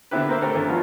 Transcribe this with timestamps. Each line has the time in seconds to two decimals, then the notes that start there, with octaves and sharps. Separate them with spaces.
0.11 D3 B3 C4 E4 G4 B4
0.29 A#3 C5 E5
0.41 A3 C4 A4 A#4
0.55 G2 E3 C#4
0.68 F3 B3 D#4 F4 F#4